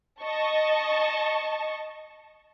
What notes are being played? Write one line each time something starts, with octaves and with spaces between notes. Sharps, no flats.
D#5 A5 C#6